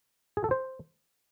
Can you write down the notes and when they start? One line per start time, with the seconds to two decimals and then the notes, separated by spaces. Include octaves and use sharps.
0.37 G#4
0.44 A4
0.51 C5